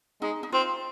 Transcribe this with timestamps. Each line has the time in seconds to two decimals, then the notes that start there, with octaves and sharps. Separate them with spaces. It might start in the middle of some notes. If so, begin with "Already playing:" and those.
0.22 G#3 D#4
0.43 D#4
0.52 C4 F4